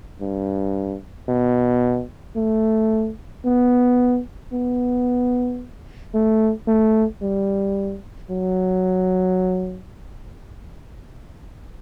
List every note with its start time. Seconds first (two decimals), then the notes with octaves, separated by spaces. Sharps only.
0.20 G2
1.28 B2
2.36 A3
3.45 B3
4.53 B3
6.14 A3
6.67 A3
7.22 G3
8.30 F#3